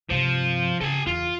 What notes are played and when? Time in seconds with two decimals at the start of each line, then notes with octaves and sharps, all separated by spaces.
0.10 G2 C3 F3
0.81 C#3 A4 G#5
1.07 E2 F4